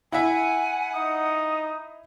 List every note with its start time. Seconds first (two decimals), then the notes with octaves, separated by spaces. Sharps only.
0.12 E4 E5 F#5 G#5
0.93 D#4 D#6